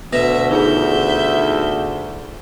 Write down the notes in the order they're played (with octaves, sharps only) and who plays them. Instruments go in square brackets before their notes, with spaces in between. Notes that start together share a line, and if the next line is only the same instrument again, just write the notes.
[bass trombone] D2 [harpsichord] B2 [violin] E5 [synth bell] A#6
[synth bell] D#4 F4 G#4 [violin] E5 G6